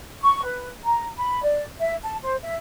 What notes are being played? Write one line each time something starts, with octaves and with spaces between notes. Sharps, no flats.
C#6
B4
A#5
B5
D5
E5
A5
C5
E5